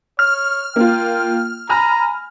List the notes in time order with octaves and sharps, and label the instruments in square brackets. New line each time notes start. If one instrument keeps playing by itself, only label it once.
[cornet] C#5 [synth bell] F6
[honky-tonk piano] A#3 F4 [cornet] G5
[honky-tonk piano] G#5 B5 F6 [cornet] A#5